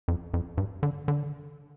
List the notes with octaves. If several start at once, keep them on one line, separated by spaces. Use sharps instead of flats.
F2
F2
G2
D3
D3